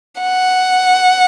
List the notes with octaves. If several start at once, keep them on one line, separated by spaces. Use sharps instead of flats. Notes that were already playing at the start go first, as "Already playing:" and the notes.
F#5